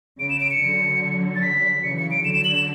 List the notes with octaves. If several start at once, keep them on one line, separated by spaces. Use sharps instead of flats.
C#3 D7
E7
D7
C#7
D3 F#3
A6
B6
C#3 E3 C#7
C#7
D7
D3 F#3 E7
E7
F#7
E7